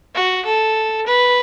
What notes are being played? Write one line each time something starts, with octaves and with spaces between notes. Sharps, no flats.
F#4
A4
B4